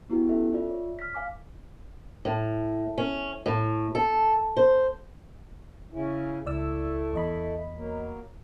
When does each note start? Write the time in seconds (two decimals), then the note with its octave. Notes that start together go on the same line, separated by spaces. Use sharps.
0.10 B3 E4 F#4 G4
0.26 C#4 A4 E5
0.53 F4 D5 E5
0.71 C#5
0.99 F6 B6
1.13 F5 G#5 D6 F6
2.25 A2
2.98 C#4
3.46 A2
3.95 A4
4.56 C5
5.92 C#3 C#4 E4
6.46 C#2 A3 E4 D5 E6
7.13 E2 D#5 B5
7.75 F#3 A#3